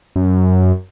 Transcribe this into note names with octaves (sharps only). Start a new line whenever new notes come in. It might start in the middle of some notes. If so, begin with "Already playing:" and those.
F#2